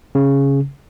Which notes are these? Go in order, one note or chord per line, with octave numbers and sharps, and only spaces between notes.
C#3